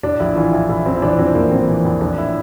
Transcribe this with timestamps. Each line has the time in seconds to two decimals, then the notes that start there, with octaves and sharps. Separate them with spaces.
0.03 A2 D4
0.20 A#1 E4
0.36 E3 F4
0.52 A#1 E4
0.69 A2 E4
0.85 A#1 C4
0.97 E4
1.02 E3 D4
1.18 A#1 C4
1.35 A2 A#3
1.51 A#1 C4
1.68 E3
1.85 A#1
2.01 A2 D4
2.18 E4